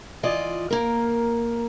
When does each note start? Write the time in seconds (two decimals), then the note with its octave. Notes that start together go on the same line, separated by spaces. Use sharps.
0.23 E3 F4 D5 D#5
0.71 A#3 A#4